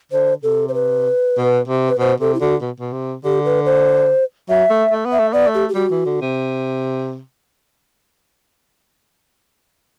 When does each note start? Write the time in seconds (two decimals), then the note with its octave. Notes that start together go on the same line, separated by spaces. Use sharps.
0.12 D3 C5
0.43 C3 A4
0.68 C5
0.74 B4
1.37 B2
1.68 C3
1.89 B4
1.99 B2 C5
2.20 C3 A4
2.35 E4
2.41 D3 F#4
2.62 B2
2.80 B2
2.93 C3
3.24 D3 G4
3.45 B4
3.66 C5
4.49 F#3 E5
4.70 A3
4.91 A3
5.06 B3
5.12 E5
5.19 A3
5.33 B3 D5
5.47 A3
5.54 G4
5.69 G4
5.75 G3 F#4
5.91 E3
6.06 D3
6.21 C3